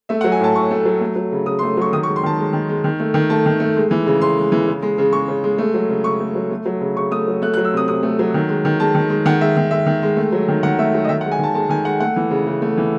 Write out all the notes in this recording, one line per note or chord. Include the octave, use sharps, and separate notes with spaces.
A3 E5
F#5
F#3
G#5
A2 A5
A2 C#6
A3
F#3
A3
F#3
C#3
C#3 D#6
C6
A3
F#3 C#6
D#3 D#6
C#6
G#3
C6
D#3 A5
G#3
D#3
G#3
D#3
A3
D#3
A3 A5
D#3
A3
G#3
E3
C#3
C#3 C6
G#3
E3
C#3
G#3
C#3
G#3 C#6
C#3
G#3
A3
F#3
C#3
C#3 C#6
A3
F#3
A3
F#3
C#3
C#3 C#6
A3 D#6
F#3
A3 F#6
F#6
F#3
E6
C3 D#6
C3 D#6
A3
F#3
D#3
G#3
D#3
G#3 A5
D#3
G#3
D#3 F#5
G#3 E5
D#3
G#3 E5
D#3
G#3
A3
F#3
D#3
D#3 F#5
A3 E5
F#3
D#5
D#3 E5
F#5
G#3
G#5
D#3 A5
G#3 A5
D#3 G#5
G#3 F#5
A3 F#5
E3
C#3
C#3
A3
E3